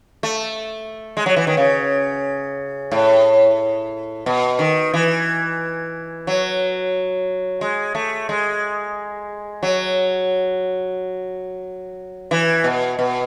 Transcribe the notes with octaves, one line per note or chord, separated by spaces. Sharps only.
A3
G#3
F#3
E3
D#3
C#3
A2
B2
D#3
E3
F#3
G#3
A3
G#3
F#3
E3
B2
B2